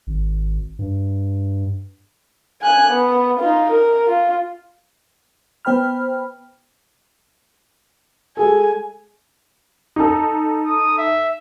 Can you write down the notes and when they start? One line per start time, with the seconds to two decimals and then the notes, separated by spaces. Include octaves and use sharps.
0.07 G#1
0.79 G2
2.62 G#5 F#6
2.92 B3
3.40 D#4 F4
3.70 A#4
4.07 F4
5.65 B3 C5 G5 B5 F6
8.37 G#3 G#4 A4 G#5
9.96 D#4 A4
10.66 D#6
10.98 E5